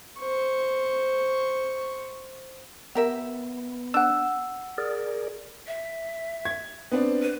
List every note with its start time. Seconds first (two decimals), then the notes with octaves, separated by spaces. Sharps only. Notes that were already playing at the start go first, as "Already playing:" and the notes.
0.19 C5 C#6
2.95 B3 G4 A#4 E5
3.94 D4 F#5 E6
4.78 G#4 A#4 D5
5.67 E5
6.45 G#6
6.91 B3 C4 D4
7.22 B4